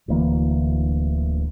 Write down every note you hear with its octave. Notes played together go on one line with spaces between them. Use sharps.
D1 D2 E3 A#3